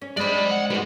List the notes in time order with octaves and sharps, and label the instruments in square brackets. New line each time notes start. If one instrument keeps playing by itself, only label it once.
[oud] C#4
[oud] G#3 C4 D4 [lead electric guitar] D5 B5
[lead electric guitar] F#5
[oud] G#2 B4 [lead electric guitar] G3 G#4